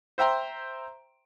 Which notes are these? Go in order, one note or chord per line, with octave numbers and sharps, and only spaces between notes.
C5 E5 G5 A#5 C6